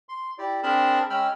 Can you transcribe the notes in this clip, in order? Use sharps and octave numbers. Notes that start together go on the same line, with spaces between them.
C6
E4 G4 D5
C4 D4 G#4 A#4 A5 B5
G#3 C#4 G5 B5 E6 F6